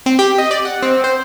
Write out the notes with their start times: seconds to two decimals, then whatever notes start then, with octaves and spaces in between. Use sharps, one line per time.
0.06 C4
0.19 G4
0.38 D#5
0.51 D5
0.65 F#5
0.82 C4
1.04 C5